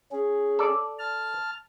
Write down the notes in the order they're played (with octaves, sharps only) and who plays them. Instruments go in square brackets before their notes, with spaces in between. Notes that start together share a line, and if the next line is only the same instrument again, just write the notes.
[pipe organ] C#4 G#4
[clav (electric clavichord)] A4 D5
[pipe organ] A5 F6